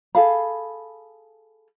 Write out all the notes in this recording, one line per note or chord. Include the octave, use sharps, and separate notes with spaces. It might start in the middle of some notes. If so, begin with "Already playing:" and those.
G#4 A4 F5 B5